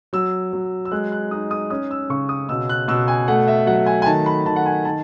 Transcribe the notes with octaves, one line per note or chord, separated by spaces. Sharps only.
F#3 E6
F#3
E6
G#3 F#6
F#6
D#4 D#6
D#6
C#4 D#6
E6
C#3 C#6
D#6
B2 E6
F#6
B2 E6
G#5
A3 F#5
E5
F#3 F#5
G#5
G#5
D#3 A5
B5
D#3 A5
F#5
G#5
D#3 A5